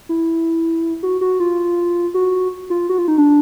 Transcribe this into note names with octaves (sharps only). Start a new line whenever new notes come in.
E4
F#4
F#4
F4
F#4
F4
F#4
F4
D#4
D4